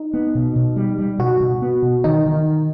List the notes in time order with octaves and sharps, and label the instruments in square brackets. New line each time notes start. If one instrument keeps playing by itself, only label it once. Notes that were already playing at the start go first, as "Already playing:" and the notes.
Already playing: [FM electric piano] D#4
[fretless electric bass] B3
B2
B2
G3
G3
[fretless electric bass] B2 [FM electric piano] F#4
[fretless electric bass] B2
B3
B2
[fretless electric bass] D#3 [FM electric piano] D#4
[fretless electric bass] D#3